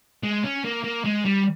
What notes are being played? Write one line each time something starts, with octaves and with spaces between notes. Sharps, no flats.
G#3
C#4
A#3
A#3
G#3
G3